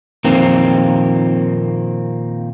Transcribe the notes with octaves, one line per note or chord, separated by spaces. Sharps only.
F2 A#2 D#3 A#3 C4